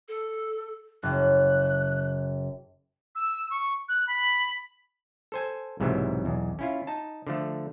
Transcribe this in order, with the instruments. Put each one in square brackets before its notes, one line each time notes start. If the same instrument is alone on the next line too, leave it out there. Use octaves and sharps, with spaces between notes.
[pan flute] A4
[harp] F#1 [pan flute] F#6
[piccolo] E6
C#6
F#6
B5
[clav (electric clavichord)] A4 C5 G#5
B1 G#2 C3 E3 F#3
B1 E2
C#4 E4 F4
D#4 A5
D3 F3 A3